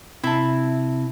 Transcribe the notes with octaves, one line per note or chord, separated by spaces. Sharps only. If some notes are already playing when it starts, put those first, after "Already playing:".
C3 E4 A5